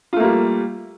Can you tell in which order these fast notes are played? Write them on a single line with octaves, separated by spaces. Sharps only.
F4 A3 A#3 G3